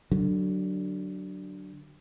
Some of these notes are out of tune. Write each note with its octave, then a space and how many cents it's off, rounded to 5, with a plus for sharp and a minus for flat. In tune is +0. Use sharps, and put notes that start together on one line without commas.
D3 +0 F#3 +20